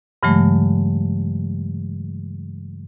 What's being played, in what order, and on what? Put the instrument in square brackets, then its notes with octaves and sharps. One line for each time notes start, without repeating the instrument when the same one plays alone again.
[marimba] G2 C#3 E3 F#3 G#3 A3